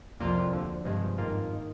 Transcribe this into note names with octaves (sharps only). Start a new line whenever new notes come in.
C2 F2 C3 G3 A#3 F4
D2 D3 F3
G2 C3 F3 G#3
F2 G#2 D#3 A#3 F4
D#3